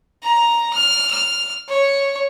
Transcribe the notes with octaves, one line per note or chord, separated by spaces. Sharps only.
A#5
F6
F6
C#5